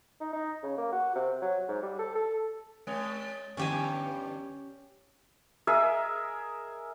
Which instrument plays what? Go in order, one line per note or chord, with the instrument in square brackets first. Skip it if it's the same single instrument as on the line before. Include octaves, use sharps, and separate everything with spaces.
[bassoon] D#4
D#4
C#3
A#3
F#4
C3
F#3
G#2
G3
A4
A4
[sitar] G#3 C#5
[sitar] G2 D3 B3 [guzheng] C#4 G4 G#5
[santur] G#4 A#4 D#5 E5